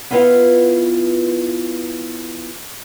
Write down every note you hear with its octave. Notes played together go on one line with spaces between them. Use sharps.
B3 E4 F4 B4 F5 F#5